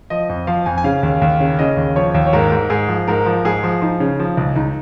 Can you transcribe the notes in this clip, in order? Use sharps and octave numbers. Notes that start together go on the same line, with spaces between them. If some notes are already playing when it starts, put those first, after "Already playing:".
F3 D#5
F2
F3 F5
F2 G#5
G#5
C#3 F5
D#2
D#2
C#3
C#3 D#5
D#2
F3 C#5
D#2
C#5
G#2 A#4
G#2
G#2 G#4
F3
G#2 A#4
F3
G#2 G#4
F3
F3 D#4
C#3
F3
C#2
C#2 D#4